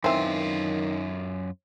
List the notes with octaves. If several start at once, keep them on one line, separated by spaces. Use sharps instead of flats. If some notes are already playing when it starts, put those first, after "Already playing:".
F#2 D#3 E3 C4 F4